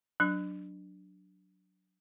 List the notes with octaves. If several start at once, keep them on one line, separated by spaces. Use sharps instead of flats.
F#3 D4 F#6